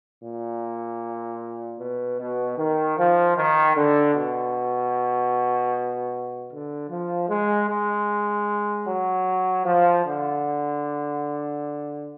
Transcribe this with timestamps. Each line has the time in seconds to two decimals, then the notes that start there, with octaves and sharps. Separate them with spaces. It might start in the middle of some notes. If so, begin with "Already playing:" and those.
0.22 A#2
1.79 B2
2.19 B2
2.58 D#3
2.97 F3
3.37 D#3
3.76 D3
4.15 B2
6.51 D3
6.90 F3
7.29 G#3
7.68 G#3
8.86 F#3
9.65 F3
10.04 D3